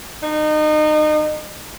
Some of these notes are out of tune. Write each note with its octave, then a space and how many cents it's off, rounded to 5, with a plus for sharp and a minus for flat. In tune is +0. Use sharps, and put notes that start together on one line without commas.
D#4 -30